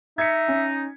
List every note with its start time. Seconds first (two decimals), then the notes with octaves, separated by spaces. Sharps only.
0.18 D#4 E5 G#6 B6 C#7
0.48 C#4